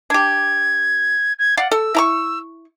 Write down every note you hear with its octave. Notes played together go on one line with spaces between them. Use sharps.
D4 G4 G#6
G#6
D5 F5 F#5
A4 E6
E4 A#5 C#6